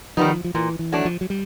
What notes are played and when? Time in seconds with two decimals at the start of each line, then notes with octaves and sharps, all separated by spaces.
0.17 D#3 F3 G3 B3 D#4
0.44 F3
0.54 A#2 E3
0.79 E3
0.92 F#3 A3 D4
1.05 F3
1.21 F#3
1.30 G3